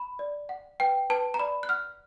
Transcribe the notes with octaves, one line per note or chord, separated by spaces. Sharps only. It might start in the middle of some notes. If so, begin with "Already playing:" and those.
Already playing: B5
D5
F#5
B4 G5
B4 A5
A#5
D5 B5
F#6
F#5 F6